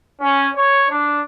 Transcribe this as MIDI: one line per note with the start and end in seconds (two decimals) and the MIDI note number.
0.20 0.47 61
0.55 0.85 73
0.89 1.20 62